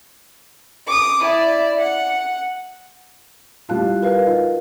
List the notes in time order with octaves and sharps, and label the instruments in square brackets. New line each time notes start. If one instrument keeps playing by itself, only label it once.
[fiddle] D6 D#6
E4 D5
F#5
[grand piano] G3 E4 F4 [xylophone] F5 A5 F#6
[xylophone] A#4 B4 F5
[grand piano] D#4 F4 F#4